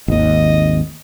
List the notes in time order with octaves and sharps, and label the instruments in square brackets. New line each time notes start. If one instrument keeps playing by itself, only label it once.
[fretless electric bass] G#1 D#2 [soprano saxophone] D#5